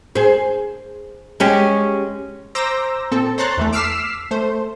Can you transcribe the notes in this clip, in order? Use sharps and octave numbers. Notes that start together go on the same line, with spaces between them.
G#4 C5
G#3 C#4 G4
C5 A#5 D6 E6 G6 A#6
A#2 C4 A4
C5 C#5 A#5 C6 F#6 A6
E2 E3 A3
D6 E6 F6 B6 C7 E7
A3 C5